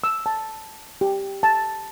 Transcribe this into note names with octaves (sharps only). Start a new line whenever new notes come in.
E6
A5
G4
A5